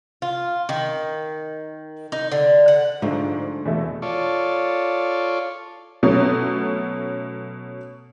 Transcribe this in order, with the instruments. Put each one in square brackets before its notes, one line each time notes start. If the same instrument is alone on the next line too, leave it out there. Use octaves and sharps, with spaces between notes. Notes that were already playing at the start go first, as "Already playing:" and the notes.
[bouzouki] F4
D#3
D#4
D3
F#5
[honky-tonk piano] G#2 [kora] D3 F3 A3
[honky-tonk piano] E2 B2 A3
[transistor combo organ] F4 A4 C#5 D5
[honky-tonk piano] B2 F#3 A3 C#4